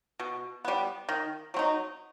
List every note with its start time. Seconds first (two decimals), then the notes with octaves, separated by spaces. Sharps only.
0.20 B2
0.65 G3 B3
1.09 D#3
1.54 F#3 C4 D#4